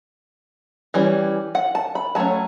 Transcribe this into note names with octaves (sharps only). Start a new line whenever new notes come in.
E3 G3 C#4
F#5
A5
B5
F#3 A3 C#4 A5